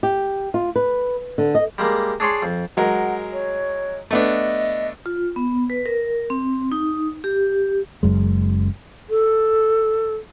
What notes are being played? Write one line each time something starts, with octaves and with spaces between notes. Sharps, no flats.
G4
F4
B4
D3
D#5
G3 G#3 A#3
D4 G#4 C#5 D5 C6
F2
F#3 G#3 A#4 F#5
C#5
A3 B3 D4 D#5
F4
B3
B4
A#4
C4
D#4
G4
F#1 F#2 G#3
A4